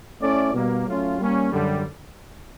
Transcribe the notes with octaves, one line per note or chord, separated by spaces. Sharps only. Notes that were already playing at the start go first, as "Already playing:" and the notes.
A3 C#4 E4 A4 D5
B2 G3 A#3
F#3 A3 C#4 F4
G3 A#3 C#4
F#2 D3 G3